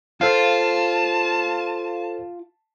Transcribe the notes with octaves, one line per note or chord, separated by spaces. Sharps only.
F4 A4 C5 F5 A5